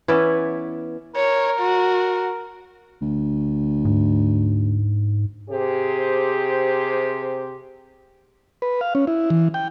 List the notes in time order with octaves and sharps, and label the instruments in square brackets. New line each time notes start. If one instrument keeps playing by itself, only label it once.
[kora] E3 B3 C#4 D5
[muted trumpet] A#4 [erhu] C#5
[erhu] F#4
[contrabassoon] D2
[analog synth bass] G#2
[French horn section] C3 G4 G#4 C5
[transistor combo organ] B4
F5
C#4
E4
E3
G5